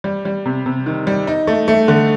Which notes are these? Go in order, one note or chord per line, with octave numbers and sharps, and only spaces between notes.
G3
G3
C3
C3
D#3
G3
D#4
A3
A3
D3